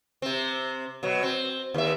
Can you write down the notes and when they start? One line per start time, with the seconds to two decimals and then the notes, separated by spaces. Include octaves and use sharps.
0.22 C3 C4
1.03 B2 F#3
1.23 C4
1.74 D#2 E5